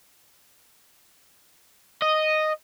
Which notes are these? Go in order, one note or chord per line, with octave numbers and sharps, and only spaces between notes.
D#5